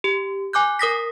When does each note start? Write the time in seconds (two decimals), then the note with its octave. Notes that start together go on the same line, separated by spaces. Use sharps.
0.04 G4
0.53 G#5 D6 F#6 G6
0.79 A#4 D#6 A#6 B6